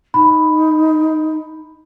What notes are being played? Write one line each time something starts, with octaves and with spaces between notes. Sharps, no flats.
D#4 B5